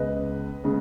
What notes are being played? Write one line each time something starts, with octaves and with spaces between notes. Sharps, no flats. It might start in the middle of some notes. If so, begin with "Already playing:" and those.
Already playing: C#2 C#3 G#3 B3 B4 D#5
C#3 G#3 B3